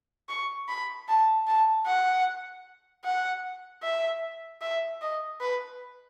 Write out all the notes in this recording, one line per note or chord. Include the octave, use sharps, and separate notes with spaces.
C#6
B5
A5
A5
F#5
F#5
E5
E5
D#5
B4